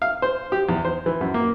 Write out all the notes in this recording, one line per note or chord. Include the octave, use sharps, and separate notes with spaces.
F5
C5
G4
E2
C5
E3
F#2
A#3